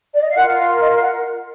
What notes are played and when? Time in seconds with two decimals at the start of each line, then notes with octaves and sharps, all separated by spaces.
0.14 D5
0.22 D#5
0.29 F5
0.36 F4 A#4 F#5
0.58 F5
0.80 D#5
0.94 F5
1.02 F#5